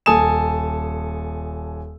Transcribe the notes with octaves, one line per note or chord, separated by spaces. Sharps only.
D#1 A4 G#5 D#6 E7